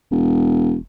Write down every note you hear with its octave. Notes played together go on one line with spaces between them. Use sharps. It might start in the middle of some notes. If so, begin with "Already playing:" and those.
E1